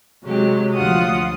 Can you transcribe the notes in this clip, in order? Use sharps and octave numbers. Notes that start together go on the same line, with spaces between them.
C3 F#3 G#3 G4
D2 F3 F4 F#5 D#6